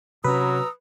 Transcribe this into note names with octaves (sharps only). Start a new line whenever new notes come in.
C3 F#3 C#4 B4 A#5 D#6 E6